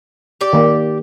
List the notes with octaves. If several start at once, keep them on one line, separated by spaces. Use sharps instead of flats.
G4 D5
D#3 A#3